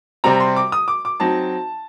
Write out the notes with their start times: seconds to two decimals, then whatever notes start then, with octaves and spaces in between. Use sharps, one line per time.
0.24 C3 G3 C4 A#5
0.40 C6
0.56 D6
0.72 D#6
0.88 D6
1.05 D6
1.20 F#3 C4 D#4 A5